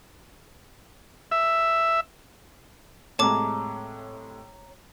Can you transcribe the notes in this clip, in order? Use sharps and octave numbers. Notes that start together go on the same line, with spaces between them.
E5
A2 C3 G#3 C#5 A5 A#5 D6